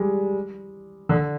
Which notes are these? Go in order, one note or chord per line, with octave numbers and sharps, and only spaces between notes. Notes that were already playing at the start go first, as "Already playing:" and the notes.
Already playing: G3 G#3
D3